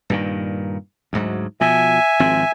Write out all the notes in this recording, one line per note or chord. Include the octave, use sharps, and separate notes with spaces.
G2 A#2 D#3
D2 G#2 F#3
B2 F3 E5 G#5
G#1 F3 C4